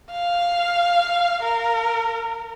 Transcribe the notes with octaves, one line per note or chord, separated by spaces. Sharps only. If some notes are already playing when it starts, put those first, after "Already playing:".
F5
A#4